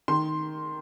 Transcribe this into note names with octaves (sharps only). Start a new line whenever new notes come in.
D#3 C6